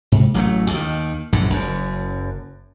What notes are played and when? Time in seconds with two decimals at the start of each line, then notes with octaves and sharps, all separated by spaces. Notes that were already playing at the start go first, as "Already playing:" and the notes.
0.12 G#2 C3
0.34 A1 F#3 G3 A3
0.71 D#2 D#3
1.33 A#1 F#2 A2 D3
1.50 F#1 F#2